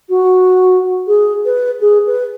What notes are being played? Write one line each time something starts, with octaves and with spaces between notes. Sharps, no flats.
F#4
G#4
B4
G#4
B4